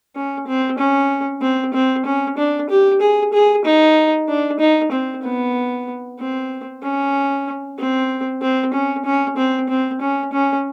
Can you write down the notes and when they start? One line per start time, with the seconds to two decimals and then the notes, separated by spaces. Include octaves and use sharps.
0.16 C#4
0.47 C4
0.78 C#4
1.42 C4
1.74 C4
2.05 C#4
2.37 D4
2.70 G4
3.01 G#4
3.33 G#4
3.65 D#4
4.28 D4
4.60 D#4
4.92 C4
5.23 B3
6.18 C4
6.83 C#4
7.79 C4
8.42 C4
8.74 C#4
9.05 C#4
9.37 C4
9.69 C4
10.01 C#4
10.33 C#4